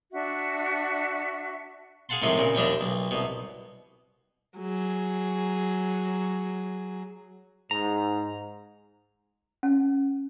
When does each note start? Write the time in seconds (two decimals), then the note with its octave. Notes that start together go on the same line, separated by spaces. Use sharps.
0.12 D4 F#4 E5
2.09 G#4 F5 F#5 A5 C6
2.22 A2 C3 D#3 F3 G#3
2.38 A#2 C#3 A#4
2.55 D#2 F3 G3 D4 E5 A#5
2.81 B1
3.11 C2 B2
4.59 F#3 G#4
7.71 G#2 A#5
9.63 C#4